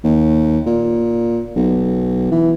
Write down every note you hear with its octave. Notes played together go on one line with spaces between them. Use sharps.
D#2
A#2
B1
E3